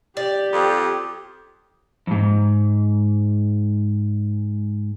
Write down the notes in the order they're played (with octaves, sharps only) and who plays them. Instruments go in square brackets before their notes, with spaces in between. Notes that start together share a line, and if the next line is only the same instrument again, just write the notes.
[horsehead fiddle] G4 [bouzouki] D5
[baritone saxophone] F2 [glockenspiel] D6 D#6
[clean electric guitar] F2 G#2